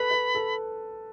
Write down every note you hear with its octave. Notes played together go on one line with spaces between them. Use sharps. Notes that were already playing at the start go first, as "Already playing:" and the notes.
Already playing: A4 B4 B5
B4
A4